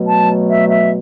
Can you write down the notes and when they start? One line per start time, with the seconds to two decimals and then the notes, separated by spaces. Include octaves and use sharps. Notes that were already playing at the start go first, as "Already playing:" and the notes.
Already playing: B2 F#3 A3
0.08 A5
0.49 E5
0.69 E5